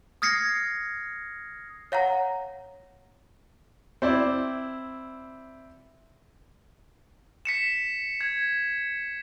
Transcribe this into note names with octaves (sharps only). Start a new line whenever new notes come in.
D#6 F6 G#6 A#6 C7 C#7
C#5 F5 F#5 A#5
C4 E4 D5
B6 C#7 E7
G#6